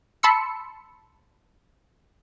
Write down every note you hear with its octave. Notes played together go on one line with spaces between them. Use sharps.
A5 B5 C6 E6 C#7